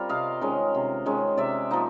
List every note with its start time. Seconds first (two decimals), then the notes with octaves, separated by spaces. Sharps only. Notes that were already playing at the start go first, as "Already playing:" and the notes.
Already playing: G3 C4 F4 A#4
0.09 C3 D#5 F5
0.41 D#3 G#3 C#4
0.75 C3
1.06 D#3 G#3 C#4
1.37 C3 D5 E5
1.71 F3 A#3 D#4